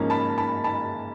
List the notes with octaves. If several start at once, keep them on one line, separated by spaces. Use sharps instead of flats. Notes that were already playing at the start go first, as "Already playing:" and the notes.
Already playing: G#2 F3 A#3 C#4 A#5
A5 B5
A5 B5
A5 B5